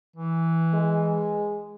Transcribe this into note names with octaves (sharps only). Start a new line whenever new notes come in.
E3
G#3